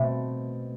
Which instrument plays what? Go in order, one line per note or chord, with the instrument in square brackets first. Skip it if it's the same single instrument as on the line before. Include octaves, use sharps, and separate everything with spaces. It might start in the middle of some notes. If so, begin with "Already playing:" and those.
Already playing: [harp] B2 A3 C4